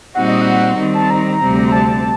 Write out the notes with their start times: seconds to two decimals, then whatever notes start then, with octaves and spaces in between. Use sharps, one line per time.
0.15 A#2 G3 C4 D#4 F#4 F#5
0.29 D#5
0.41 F#5
0.78 D#3 G3 C4
0.94 A5
1.10 A#5
1.41 D2 C3 G3 C4
1.67 A#5
1.72 A5